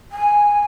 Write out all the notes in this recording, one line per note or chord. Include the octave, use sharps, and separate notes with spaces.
G#5